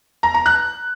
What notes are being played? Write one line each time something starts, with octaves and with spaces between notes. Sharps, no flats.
A#5
A#5
F#6